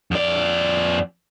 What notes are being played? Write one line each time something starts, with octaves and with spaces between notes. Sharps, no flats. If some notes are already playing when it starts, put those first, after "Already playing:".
F2 D5